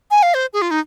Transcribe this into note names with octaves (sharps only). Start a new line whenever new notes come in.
G#5
F5
C5
G#4
F4
D#4